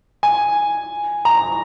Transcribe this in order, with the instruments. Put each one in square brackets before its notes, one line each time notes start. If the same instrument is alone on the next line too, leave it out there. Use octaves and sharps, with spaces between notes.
[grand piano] G#5
A#5